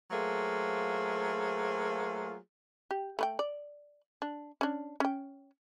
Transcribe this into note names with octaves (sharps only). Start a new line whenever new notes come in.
F#3 A3 A#3 F4 G#4 C5
G4
A3 B4 G5
D5
D4
C#4 D4
C#4 G5